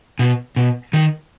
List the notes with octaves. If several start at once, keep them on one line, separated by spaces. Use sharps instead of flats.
B2
B2
D#3